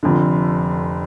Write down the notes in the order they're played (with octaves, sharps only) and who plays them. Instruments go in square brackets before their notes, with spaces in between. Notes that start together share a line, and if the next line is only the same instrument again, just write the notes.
[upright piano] F1 F2 D3